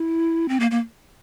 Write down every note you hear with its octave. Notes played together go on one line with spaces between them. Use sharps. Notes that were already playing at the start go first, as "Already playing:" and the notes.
Already playing: E4
C4
A#3
A#3